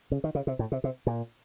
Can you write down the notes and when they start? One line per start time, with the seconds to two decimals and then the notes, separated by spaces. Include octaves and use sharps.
0.12 C#3
0.24 D#3
0.35 C#3
0.47 C3
0.59 A2
0.72 C3
0.84 C3
1.07 A#2